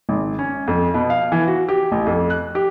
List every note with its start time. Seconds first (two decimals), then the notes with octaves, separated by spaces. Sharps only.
0.09 G#1
0.39 C#4
0.68 F2
0.94 B2
1.10 F5
1.32 E3
1.47 F#4
1.68 G4
1.92 A1
2.07 F2
2.30 F#6
2.55 G4